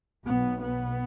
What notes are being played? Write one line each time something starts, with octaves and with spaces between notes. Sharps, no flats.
B1 B2 B3
B3